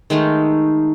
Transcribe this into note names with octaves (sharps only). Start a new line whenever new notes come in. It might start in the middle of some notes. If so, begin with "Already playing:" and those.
D#3 G#3 A3 D#4